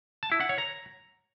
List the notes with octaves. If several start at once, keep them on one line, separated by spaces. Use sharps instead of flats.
A5
E4
F#5
C#5
A#5